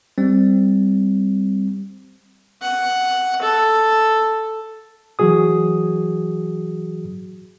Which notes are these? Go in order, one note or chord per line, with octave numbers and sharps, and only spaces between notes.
G3 C4
F#5
A4
E3 F#3 F#4 G#4 D#6